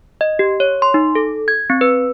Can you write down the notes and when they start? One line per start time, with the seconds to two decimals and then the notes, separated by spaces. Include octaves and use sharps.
0.21 D#5
0.39 G4
0.60 C#5
0.82 C6
0.94 D#4
1.15 A4
1.48 G#6
1.70 C4
1.81 B4